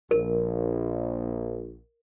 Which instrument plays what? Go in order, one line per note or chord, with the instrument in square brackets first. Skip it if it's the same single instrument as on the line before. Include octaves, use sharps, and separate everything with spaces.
[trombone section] A#1 [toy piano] A#4